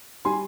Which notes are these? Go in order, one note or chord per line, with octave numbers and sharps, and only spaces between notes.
G3 G#5 C6